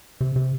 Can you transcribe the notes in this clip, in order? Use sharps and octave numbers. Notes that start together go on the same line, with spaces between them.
C3
C3